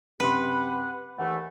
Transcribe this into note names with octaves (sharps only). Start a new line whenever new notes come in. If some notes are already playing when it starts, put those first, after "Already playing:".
F#2 C3 G4 B4 F#5 C6
D#2 E3 A3 F#5